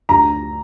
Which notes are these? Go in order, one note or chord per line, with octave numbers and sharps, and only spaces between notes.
D2 A#5